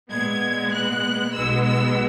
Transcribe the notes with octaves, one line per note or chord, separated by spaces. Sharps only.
A#2 G#3 B3 G#6
F#6
B1 B2 G#3 B3 E6
E6